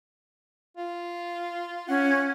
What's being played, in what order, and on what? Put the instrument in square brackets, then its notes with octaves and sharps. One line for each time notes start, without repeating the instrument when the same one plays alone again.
[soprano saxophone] F4
[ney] C#4 [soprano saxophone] F#5